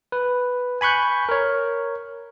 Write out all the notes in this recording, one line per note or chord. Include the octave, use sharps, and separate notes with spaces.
B4
G#5 B5 C#6 F#6 G6
A#4 C#5